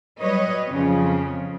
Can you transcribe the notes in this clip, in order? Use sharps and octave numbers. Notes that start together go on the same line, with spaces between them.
F#3 G3 B4 C#5 D#5
F2 C#3 F3